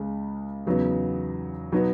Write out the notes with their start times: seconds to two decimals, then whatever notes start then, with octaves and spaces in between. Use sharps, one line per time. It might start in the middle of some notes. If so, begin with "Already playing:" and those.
Already playing: C#2 C#3 G#3
0.66 E2 C#3 F#3 B3 D#4
1.72 B2 F#3 B3 D#4